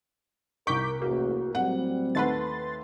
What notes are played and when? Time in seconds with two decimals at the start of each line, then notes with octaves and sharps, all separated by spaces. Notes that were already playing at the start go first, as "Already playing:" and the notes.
0.67 C2 A#4 C#6 D6 G6 B6
1.02 A1 E2 A#3 F#4
1.55 A2 F#3 G3 C4 F#5
2.15 D#2 A3 B4 F#5 C6 A6